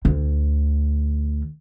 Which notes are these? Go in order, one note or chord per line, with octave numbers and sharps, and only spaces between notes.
D2 D3